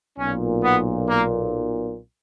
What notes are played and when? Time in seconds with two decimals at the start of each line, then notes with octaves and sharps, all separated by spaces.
0.18 B1 A#2 C#4
0.63 B3
1.08 A#3